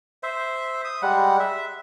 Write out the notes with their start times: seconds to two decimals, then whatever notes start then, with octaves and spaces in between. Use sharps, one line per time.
0.23 C5 E5
0.85 D#6
1.02 G3 G#3 F#5
1.40 E5